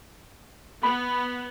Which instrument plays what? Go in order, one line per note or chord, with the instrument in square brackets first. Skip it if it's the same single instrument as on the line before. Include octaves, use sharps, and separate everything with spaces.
[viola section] B3 [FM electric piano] B5